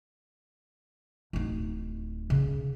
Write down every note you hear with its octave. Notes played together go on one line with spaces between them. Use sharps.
D1 D#4
C#3